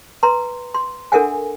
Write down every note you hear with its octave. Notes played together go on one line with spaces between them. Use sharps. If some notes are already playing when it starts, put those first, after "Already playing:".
B4 A#5 C6
C6
D4 A4 A#4 E5 F#5 G#5